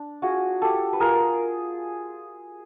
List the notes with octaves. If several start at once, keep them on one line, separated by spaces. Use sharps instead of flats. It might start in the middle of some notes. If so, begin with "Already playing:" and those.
Already playing: D4
F4 F#4 G#4
F4 G4 A4
B4
F4 G#4 A#4